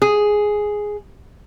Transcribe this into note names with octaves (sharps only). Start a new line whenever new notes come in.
G#4